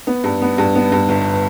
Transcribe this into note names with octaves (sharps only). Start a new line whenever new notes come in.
B3
G2
B3
G2
B3
G2
G1